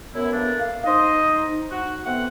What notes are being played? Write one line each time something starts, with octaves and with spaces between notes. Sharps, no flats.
F#2 B3 E4
A3 A#3 D4
F5
D#4 C5 D#5
F#4
A3 B3 C4 F#5